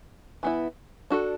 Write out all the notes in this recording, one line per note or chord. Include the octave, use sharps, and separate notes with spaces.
E3 B3 E4
D4 F#4 A4